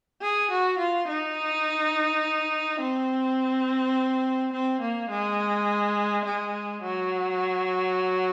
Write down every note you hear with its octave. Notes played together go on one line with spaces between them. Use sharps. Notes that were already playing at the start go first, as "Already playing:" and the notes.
G#4
F#4
F4
D#4
C4
C4
A#3
G#3
G#3
F#3